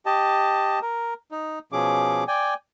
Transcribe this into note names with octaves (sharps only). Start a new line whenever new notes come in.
G4 D#5 A5
A#4
D#4
B2 F3 C#4 G#4 D6
D5 G5 G#5